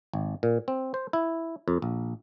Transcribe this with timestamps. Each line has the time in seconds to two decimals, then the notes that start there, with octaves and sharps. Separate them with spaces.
0.13 G#1
0.43 A#2
0.68 C4
0.94 C5
1.13 E4
1.68 F2
1.82 A#1